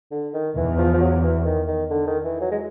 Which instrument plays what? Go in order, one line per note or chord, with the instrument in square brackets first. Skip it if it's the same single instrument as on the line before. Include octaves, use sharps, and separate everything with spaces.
[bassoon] D3
D#3
[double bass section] E2 [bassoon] E3
[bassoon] F3
F3
F#3
E3
D#3
D#3
D3
D#3
E3
F#3
G#3